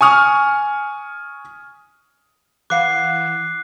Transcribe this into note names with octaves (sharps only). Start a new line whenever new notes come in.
G#5 C#6 D#6 F6
E3 B4 F5 F#5 D6 F#6 C7